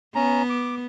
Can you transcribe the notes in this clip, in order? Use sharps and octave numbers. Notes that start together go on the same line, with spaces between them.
B3 C#4 A#5
D6